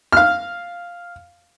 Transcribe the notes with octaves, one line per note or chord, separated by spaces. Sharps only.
F5 F6